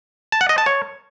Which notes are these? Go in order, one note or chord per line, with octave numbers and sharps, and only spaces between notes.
A5
F#5
D#5
A5
C#5